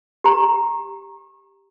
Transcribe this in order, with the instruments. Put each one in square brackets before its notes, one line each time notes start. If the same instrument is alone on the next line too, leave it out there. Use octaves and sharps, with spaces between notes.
[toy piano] G4 A#5